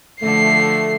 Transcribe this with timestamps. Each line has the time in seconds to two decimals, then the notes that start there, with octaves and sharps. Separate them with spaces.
0.22 D3 F3 A3 C7